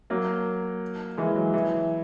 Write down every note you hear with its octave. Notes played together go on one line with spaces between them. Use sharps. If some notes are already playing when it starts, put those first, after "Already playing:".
F#3 A#3
E3 G#3
F#3
E3